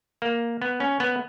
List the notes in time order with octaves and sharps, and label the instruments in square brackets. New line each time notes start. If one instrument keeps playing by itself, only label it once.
[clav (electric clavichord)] A#3
B3
C#4
B3